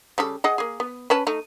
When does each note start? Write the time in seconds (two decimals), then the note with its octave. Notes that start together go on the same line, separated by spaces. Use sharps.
0.18 C#3 G3 A4
0.44 G#4 D#5 F#5
0.58 A#3 G#4
0.80 B3
1.10 C#4 B4 A5
1.27 A3 D#4